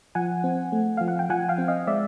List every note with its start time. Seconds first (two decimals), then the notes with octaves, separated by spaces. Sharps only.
0.15 F3 F#5 G#5
0.44 C4
0.72 A3
0.97 F3 F5
1.08 F#5
1.19 G5
1.29 F3 F#5 G#5
1.49 F5 G5
1.58 C4
1.68 D#5 F5
1.87 G#3 D5 E5